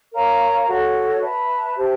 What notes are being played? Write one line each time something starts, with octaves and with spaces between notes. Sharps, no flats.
A#4 C#5 F5 A#5
F#4 A4 C#5
B4 E5 A5
G4 C5 E5 A5